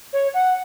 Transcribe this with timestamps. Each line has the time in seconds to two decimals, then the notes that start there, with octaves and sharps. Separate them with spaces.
0.13 C#5
0.34 F#5